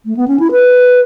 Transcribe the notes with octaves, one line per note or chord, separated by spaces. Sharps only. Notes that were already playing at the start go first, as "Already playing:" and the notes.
A3
B3
C#4
E4
B4